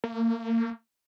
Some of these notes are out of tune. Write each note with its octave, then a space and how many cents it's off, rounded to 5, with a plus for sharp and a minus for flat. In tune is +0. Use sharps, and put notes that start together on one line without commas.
A#3 -30